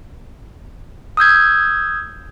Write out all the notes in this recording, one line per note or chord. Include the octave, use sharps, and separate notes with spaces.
D#6 E6 G6 G#6